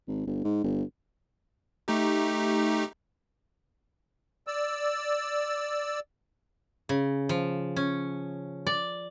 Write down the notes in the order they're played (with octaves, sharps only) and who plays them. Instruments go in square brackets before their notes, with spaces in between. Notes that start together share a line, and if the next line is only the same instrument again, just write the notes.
[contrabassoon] G#1
G1
G#2
G1
[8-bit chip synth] A3 D#4 G4
[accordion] D5 E6
[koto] C#3
F3
C#4
D5